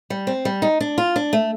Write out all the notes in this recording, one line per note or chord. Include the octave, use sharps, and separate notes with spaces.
G3
C4
G3
D#4
D4
F4
D4
A3